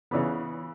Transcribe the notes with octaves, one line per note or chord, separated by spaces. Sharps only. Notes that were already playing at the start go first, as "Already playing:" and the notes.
C#3 E3 B3